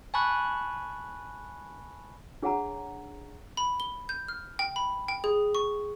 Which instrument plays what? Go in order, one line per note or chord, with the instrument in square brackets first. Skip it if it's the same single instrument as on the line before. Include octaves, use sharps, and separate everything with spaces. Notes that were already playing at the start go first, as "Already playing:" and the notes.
[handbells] G#5 A5 B5 C#6 F#6
[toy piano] D4 G#4 C#5 F#5 G#5 A#5
[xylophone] B5
G7
G6
F6
G5
B5
G5
G#4
C#6